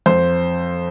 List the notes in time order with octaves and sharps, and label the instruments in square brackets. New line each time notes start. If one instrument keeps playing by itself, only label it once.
[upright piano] F2 C5